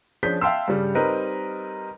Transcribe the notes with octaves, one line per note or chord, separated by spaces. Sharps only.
F3 C#4 D4 G#4 G6 B6
E5 F5 G5 A5 C6 E6
G2 C#3 G3
G3 C4 D#4 A#4 B4 D#5